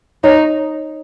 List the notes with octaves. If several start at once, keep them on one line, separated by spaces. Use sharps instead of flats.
D#4 C#5